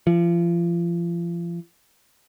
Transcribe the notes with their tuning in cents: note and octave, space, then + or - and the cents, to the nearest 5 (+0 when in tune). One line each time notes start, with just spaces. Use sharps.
F3 -35